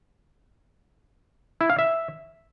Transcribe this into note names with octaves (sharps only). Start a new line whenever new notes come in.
E4
F5
E5